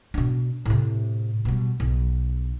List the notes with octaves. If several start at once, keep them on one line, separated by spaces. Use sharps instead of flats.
B2 D4
A2 C3
B2 G3
B1